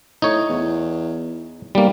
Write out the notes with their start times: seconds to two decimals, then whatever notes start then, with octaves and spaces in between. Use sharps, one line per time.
0.22 A2 D#4 C#5
0.49 E2
1.75 B1 G3 A#3